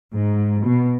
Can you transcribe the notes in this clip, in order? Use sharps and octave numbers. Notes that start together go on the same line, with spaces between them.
G#2
B2